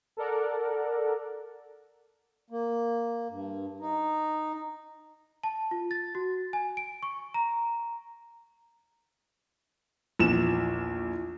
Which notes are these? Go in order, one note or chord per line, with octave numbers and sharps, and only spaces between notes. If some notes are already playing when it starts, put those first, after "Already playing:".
A4 A#4 D5 F#5
A#3
G2
D#4
A5
F4
A6
F#4
G#5
D7
C#6
A#5
A#1 E2 E7